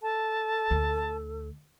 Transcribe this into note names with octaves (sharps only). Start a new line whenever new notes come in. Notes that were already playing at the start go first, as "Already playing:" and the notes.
A4 A5
D2